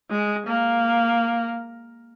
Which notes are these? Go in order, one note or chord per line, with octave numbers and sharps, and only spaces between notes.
G#3
A#3